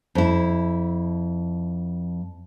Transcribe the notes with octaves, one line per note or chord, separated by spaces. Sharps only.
F2 E4